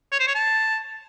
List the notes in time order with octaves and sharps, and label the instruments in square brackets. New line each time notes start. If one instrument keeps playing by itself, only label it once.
[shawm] C#5
C5
C#5
A5